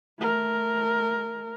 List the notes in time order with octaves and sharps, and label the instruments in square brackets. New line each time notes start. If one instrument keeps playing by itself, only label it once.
[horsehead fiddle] A3 A#4